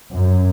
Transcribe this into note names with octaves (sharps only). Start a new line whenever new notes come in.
F#2